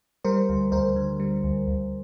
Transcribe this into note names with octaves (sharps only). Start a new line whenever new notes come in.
G3 A#4 C5
D2
D2 A#4 C5
D3
G3
D2
D2